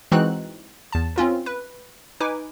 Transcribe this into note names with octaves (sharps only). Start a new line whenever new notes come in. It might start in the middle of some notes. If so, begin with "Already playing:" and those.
E3 G#3 C4 D#4 F#4 F#6
E2 A5
C4 C#4 F4 A#4
B4
D#4 B4 G#5 D6